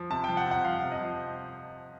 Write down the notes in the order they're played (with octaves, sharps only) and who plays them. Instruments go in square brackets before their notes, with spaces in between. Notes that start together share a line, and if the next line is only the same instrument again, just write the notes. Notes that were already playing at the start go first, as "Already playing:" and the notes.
Already playing: [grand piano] F3
C3 A5
F3 G5
F#5
C3
F#5
F3 F5
C3
D#5
F3